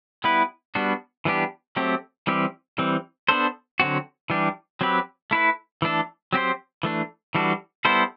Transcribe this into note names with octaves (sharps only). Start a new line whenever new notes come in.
G3 B3 E4 B4
G3 B3 D4 F#4
E3 G3 B3 D4 G4
F#3 A3 C4 G4
E3 G3 C4 G4
E3 G3 C4
B3 D4 A4 C5
D3 F#3 C4 F#4
E3 G3 D4 G4
F#3 C4 G4 B4
A3 E4 B4
E3 A3 D4 A4
F#3 C4 G4 C5
E3 A3 D4
E3 G3 D4 F#4 A4
G3 B3 E4 A4 C5